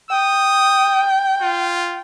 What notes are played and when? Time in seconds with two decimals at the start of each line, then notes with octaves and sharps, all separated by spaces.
0.11 G5 D#6
1.42 F4